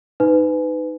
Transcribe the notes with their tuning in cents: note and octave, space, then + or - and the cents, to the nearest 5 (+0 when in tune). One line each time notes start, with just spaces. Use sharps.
D#4 -5 B4 +25